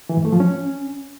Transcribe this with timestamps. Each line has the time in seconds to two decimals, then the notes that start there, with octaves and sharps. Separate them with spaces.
0.09 E3
0.17 G#2
0.25 A3
0.32 F3
0.40 C#4